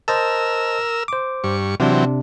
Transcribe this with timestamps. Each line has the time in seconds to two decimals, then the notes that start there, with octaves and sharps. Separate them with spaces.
0.08 A#4 C5 D#5 A5 E6
1.08 C5 D6
1.44 G2 C#6
1.80 C3 E3 F#3 C4 D4